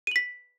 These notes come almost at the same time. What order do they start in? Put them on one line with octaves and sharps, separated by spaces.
D#7 F#7 B6